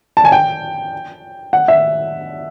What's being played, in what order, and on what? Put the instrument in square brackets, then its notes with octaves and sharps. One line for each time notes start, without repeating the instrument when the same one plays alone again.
[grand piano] A5
G#5
G5
F#5
E5